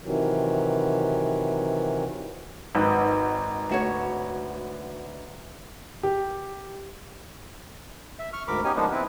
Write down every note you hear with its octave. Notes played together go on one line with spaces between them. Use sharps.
C3 D#3 E3 F#3
G#1 B3 D#4
D2 F#4 C#5
G4
E5
C#6 F6
D2 G#2 A#4 B5 D6
B3 C#4 D#4 G4 G#5
F3 G#3 A#3 B3 D4 D#4
C4 E4 B4